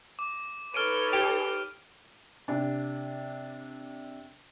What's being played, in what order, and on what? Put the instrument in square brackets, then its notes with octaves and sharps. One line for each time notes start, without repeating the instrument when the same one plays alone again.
[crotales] D6
[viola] D#4 B4 [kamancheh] A4 C#5 [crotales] F6 D7 D#7
[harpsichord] G4
[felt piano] C3 D4